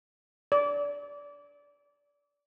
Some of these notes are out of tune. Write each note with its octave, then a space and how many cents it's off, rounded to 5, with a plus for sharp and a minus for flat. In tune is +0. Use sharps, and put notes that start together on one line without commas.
D5 -25